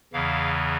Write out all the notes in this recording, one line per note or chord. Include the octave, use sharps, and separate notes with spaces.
E2 C#3 E3 F5